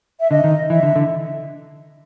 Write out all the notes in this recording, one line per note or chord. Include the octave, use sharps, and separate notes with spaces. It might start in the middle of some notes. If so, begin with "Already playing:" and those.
E5
D3 D#5
D#3
E3 E5
D3
D3